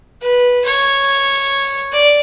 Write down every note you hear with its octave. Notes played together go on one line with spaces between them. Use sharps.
B4
C#5
D5